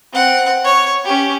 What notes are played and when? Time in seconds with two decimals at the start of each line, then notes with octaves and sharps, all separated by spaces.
0.13 C4 F#5
0.64 C#5
1.04 C#4 G4